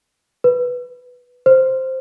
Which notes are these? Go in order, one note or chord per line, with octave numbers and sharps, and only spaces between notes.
B4
C5